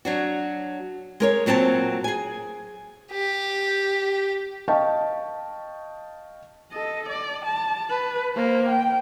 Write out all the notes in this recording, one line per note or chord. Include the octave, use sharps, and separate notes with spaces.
F#3 D4 F#4
G#3 A#4 C#5
A#2 F#3 C4 D5 A5
G#4 G#5
G4
D#5 F5 G5 A5 C#6
A4 D#5
D5
A5
B4
A#3 C5
G5